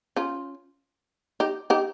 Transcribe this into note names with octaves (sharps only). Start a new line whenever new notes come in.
C#4 F4
D#4 G4
D#4 G4